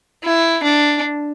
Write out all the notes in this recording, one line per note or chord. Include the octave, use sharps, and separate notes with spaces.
E4
D4